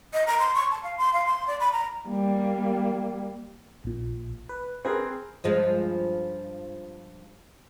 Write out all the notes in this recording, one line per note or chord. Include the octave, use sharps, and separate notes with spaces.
D#5
A#5
C6
C#6
A5
F5
C6
F5
C6
D5
B5
A#5
G3 A#3
A#1 A#2
B4
C4 G#4 A#4 B4
G2 F3 G#3